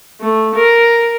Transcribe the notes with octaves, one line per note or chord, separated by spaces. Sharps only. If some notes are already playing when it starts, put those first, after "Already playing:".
A3
A#4